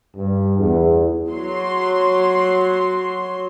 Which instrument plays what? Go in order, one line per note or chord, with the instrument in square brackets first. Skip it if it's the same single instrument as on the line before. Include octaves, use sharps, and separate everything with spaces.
[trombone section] G2
E2
[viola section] F#3 C6